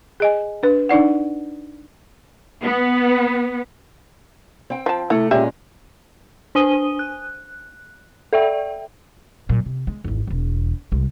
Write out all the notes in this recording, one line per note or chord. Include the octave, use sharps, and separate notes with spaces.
G#4 D#5 G#5
D4 B4
D4 D#4 D5 F#5
B3
C4 G5
F3 A5
C3 A3 E4 A4
A#2 G#3 C#4 G4 E5
D4 C5 G#5 D#6 D#7 G7
F#6
A4 D5 E5 G5
A#2 F#3
C3
G#3
G#1 E2
E1 E2
C2 G#3